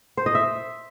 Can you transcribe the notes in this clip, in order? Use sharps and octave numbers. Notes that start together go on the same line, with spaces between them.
C5
D#5
E5